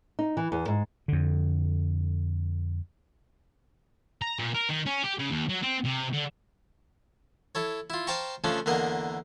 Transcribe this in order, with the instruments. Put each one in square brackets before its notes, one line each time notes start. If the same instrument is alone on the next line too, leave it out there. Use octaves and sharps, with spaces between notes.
[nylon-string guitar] D#4
E3
E2
G#2
[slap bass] F2 D3
[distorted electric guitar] A#5
A#2
A#4
D#3
C#4
G4
C#3
D#2
F#3
C4
C3
D3
[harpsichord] E4 A4 C#5
E4 F4
C5 F5 G5 A5 A#5 C#6
C#3 F3 A3 C#4 D4
E2 D3 A#3 A#4 D#5